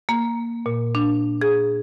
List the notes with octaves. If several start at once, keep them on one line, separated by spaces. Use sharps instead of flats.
A#3
A#2
D4
G#4